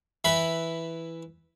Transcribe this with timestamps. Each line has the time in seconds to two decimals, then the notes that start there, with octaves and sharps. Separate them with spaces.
0.25 E3 E4 B4 B5